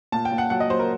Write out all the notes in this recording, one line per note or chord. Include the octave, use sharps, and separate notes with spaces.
A#2 A5
G5
A#2
F#5
F#3 F#5
D#5
F#3 C5
A#4